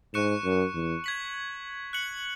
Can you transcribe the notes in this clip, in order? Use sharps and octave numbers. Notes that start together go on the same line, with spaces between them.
G#2 C#6 F#6 C#7 E7
F#2
E2
G#6 B6 F#7
F#6 C#7 F#7